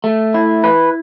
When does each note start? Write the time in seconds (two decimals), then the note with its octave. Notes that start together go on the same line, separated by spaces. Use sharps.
0.04 A3
0.34 E4
0.64 B4